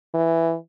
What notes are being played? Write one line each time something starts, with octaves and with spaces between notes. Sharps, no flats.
E3